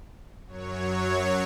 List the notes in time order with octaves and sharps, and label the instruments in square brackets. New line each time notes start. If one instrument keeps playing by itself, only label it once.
[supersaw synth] F#2 F#3 C#5